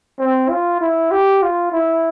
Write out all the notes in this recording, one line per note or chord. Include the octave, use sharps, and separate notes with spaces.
C4
F4
E4
G4
F4
E4